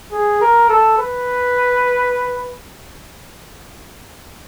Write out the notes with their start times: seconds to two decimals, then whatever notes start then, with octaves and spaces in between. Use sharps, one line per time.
0.12 G#4
0.41 A#4
0.69 A4
0.98 B4